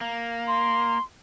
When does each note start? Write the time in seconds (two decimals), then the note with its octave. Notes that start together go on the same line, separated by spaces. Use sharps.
0.01 A#3
0.48 C6